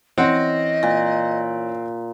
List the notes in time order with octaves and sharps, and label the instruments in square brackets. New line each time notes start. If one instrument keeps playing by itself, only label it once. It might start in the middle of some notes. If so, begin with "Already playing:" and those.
[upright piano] E3 C#4 [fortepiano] C4 F#5 [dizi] D#5
[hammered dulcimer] A#2